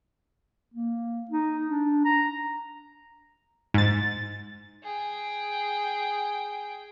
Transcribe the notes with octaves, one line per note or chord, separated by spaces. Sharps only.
A#3
D#4
D4
A#5
G#2 A6
G#4 G5